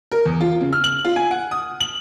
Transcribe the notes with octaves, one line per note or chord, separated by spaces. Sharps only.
A#4
E2
F4
C#3
F6
F#7
F4
G#5
F#5
D#6
F#7